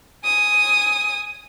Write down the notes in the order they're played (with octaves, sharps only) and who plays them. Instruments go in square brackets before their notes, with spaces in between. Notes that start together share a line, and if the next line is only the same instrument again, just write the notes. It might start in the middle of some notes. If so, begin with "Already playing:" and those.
[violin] G#5 D#6